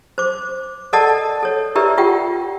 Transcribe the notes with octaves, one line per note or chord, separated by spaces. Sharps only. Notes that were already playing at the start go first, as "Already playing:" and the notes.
C5 D6
A4 A#4 D5 D#5 F#5 A5
A4 C#5
E4 G4 A#4 B4 D5 E5
F4 G4 F#5 G5